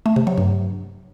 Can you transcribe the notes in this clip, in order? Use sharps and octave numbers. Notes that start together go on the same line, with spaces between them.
A3
C3
F#3
G2